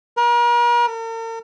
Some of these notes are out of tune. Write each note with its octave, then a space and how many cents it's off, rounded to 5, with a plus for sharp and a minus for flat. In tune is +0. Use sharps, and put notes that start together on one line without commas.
A#4 +40
A#4 -45